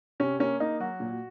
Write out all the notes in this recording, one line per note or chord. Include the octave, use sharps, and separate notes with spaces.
C3 C#4
A#3 C#4
A#3 D#4
F#3 F#4
A#2